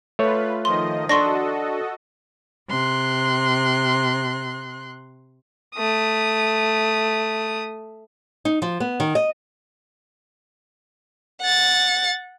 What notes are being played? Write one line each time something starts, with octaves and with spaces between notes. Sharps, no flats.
A3 F4 B4 C#5
D#3 F3 D#5 C6
D4 F#4 A4 D#5 C6 C#6 A#6
C3 C6 F#6
A3 D#6
D#4
F3
B3
D#3
D#5
F#5 A6